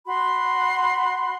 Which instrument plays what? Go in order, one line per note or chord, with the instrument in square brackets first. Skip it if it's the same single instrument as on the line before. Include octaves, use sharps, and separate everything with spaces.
[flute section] F#4 B5 C6